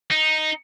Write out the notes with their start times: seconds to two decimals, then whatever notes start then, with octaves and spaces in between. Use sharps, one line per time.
0.11 D#4